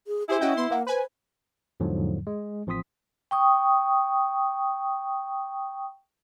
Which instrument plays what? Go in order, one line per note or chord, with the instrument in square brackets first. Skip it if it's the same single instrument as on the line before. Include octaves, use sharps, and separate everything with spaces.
[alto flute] G#4
[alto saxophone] E4 [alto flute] G4 [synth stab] G#4 C5
[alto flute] C#4 [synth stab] F#4 D#5 G5
[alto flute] B3 [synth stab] C6
[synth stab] A#3 [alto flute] F#5
[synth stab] B4 G#5 [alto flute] C5
[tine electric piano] E2 G#2 D3 F3 F#3
G#3
A1 F3 C4 C6 D#6 B6
[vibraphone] G5 C#6 D#6